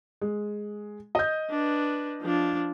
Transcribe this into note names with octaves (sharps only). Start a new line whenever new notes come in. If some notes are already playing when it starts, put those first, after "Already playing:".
G#3
D#5 G6
D4 B4
F3 D4